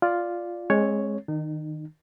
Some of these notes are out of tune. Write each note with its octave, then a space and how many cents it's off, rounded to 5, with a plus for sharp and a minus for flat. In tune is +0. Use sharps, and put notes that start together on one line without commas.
F4 +0 D5 +0
G#3 +0 C4 +40 C#5 +0
D#3 +0 D#4 -35